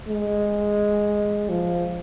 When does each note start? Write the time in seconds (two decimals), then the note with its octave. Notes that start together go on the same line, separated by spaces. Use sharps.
0.08 G#3
1.49 F3